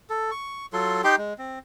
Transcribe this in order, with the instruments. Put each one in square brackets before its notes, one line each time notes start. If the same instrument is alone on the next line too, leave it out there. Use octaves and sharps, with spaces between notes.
[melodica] A4
C#6
F#3 F4 A4 C6
D#4 G4 G5 C6
G#3
C4